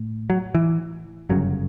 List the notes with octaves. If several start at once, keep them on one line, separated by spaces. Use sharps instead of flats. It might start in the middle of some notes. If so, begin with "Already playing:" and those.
Already playing: A2
F#3
E3
G1 F#2 C#3 F#3